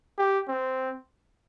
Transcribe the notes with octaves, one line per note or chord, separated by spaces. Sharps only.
G4
C4